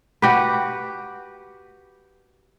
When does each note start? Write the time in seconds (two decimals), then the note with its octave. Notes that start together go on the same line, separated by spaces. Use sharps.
0.22 F#4 G4 B4